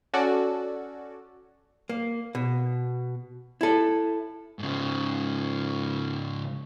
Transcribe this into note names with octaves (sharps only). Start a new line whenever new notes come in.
C#4 F#4 A4 D5
A#3
B2
E4 A4
G#2 C#3